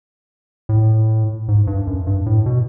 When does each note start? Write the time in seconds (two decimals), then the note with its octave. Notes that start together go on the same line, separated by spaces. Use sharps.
0.69 A2
1.48 G#2
1.67 G2
1.87 F#2
2.07 G2
2.26 A2
2.46 B2